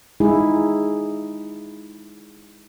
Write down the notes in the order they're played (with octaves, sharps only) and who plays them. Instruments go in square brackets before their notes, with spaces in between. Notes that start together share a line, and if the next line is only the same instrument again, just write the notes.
[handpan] G#3 D#4 E4 G#4